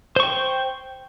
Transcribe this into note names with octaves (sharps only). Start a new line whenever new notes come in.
C5 G5 C#6